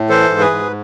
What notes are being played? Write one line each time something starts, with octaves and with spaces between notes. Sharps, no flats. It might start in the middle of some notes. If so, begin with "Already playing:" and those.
Already playing: A2
E3 A4 C5
G#2
G#4 B4
G#2